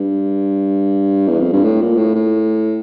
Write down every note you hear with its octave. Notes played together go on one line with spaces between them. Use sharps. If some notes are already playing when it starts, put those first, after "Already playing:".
Already playing: G2
E2
F2
G2
A2
A#2
A2
A2